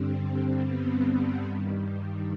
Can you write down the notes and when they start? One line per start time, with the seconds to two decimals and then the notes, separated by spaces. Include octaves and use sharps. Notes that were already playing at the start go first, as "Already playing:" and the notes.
Already playing: G2 D3 G3 C4
0.67 B3
1.44 G2 D#3 G3